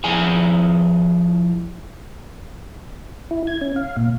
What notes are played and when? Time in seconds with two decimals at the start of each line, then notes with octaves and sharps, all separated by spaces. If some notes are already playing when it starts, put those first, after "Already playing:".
0.04 F3 E4 G#4 G#5 A#5
3.31 E4
3.47 G#6
3.61 C#4
3.76 F5
3.97 A#2